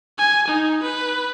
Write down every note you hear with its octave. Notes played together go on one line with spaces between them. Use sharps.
G#5
D#4
B4